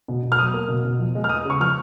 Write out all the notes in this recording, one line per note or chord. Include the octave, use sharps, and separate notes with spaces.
B2
B2
F6
F#3 D#6
A#3
B2
B2
F3
G#3
F6
B3 D#6
C#3 C#6
F3 F6